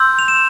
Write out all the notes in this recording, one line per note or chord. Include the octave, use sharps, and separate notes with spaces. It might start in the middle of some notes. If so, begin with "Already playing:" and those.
Already playing: C6 E6 G6
F7
E7